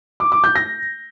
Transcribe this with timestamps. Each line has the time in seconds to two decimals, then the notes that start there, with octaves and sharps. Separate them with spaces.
0.20 D6
0.32 D6
0.44 G6
0.55 A#6